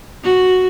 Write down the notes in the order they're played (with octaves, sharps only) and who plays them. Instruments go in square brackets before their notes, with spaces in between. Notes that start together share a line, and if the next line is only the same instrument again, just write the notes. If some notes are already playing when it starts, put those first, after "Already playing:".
[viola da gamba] F#4